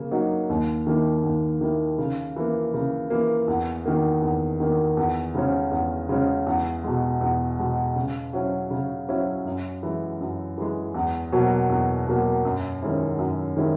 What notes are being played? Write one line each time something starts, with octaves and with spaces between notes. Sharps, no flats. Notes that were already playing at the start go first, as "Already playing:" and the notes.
Already playing: C#3 A#3
F#3 A#3 D#4
D#2
D#3 A#3 E4
D#2
D#3 A#3 E4
C#3
E3 A#3
C#3
E3 A#3
E2
D#3 A#3
E2
D#3 A#3
E2
C#3 G#3 C#4
E2
C#3 G#3 C#4
E2
B2 G#3
E2
B2 G#3
C#3
F#3 C#4 E4
C#3
F#3 C#4 E4
F#2
E3 G#3
F#2
E3 G#3
E2
B2 F#3 A#3
E2
B2 F#3 A#3
F#2
D#3 G#3 C#4 E4
F#2
D#3 G#3 C#4 E4